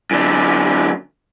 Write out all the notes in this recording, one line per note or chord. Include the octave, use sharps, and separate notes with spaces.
F#2 D3